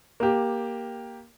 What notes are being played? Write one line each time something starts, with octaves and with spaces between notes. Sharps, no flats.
A#3 G4